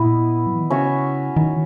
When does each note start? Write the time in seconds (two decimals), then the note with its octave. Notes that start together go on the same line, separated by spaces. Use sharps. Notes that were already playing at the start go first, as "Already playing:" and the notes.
Already playing: A#2 B3 E4 B4 D#5
0.47 F#3
0.54 E3
0.62 D#3
0.70 C#3 C#4 F#4 C#5 E5
1.37 D#3